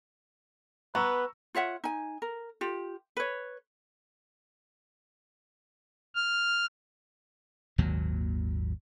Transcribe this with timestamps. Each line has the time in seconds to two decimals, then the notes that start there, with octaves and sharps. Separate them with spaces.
0.95 B3 B4 A#5 C#6 E6
1.55 F4 C#5 E5 F#5
1.84 D#4 G#5
2.22 A#4
2.61 F4 G4
3.17 B4 C#5
6.15 F6
7.78 G#1 D#2 A#2 F#3